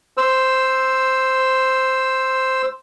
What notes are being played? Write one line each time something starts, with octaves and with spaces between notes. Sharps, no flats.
C5 E6